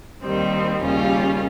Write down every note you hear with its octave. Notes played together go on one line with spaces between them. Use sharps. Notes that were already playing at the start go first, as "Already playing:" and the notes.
D#2 D#3 G3 C4
D#2 C#3 G3 C#4 F4